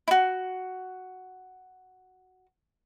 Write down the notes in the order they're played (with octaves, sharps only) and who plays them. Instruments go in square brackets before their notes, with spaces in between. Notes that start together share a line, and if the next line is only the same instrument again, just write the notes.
[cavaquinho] E4 F#4